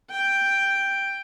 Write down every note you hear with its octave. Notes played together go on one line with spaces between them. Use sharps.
G5